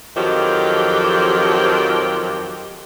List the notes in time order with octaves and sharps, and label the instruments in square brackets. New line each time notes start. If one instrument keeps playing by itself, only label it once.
[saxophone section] F2 D#3 F3 F#3 G4